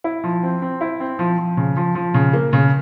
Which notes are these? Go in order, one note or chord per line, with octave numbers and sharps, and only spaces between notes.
E4
F3
C4
C4
E4
C4
F3
F3
C#3
F3
F3
C#3
A#3
C#3